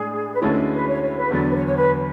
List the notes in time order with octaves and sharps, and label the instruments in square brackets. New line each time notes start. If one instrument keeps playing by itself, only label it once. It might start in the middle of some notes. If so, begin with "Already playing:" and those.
Already playing: [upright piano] A2 G#3 D4 [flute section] G#4
[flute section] B4
[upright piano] D2 D3 G#3 C#4 E4 [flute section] A4
[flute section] B4
C#5
C#5
B4
[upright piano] E2 D3 F#3 [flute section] D5
[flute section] B4
C#5
C#5
B4